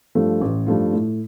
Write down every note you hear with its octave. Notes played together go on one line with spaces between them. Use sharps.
G2 F3 A3 F4
A1
G2 F3 A3 F4
A2